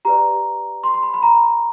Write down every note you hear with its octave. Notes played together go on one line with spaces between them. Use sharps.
G4 B4 D5 A#5
C6
C6
B5
B5
A#5